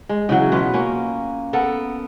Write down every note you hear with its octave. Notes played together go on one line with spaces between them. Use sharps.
G#3
C#3 E3 F#3
B2 F4 B4
A#3 C#4
B3 A4 A#4